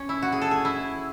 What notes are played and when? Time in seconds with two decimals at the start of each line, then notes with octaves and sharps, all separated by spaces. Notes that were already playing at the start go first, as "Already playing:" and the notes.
Already playing: C#4
0.09 E4
0.22 F#4
0.32 G#4
0.42 A4
0.51 G#4
0.65 E4